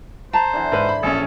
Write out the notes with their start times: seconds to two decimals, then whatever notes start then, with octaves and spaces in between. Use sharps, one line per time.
0.33 C5 A5 A#5
0.53 D3 E3
0.72 G#2 B4
0.89 B5
1.03 A#1 C#4 G#4 A4